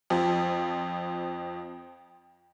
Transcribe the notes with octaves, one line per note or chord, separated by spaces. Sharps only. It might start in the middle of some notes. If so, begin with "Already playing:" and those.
F2 F3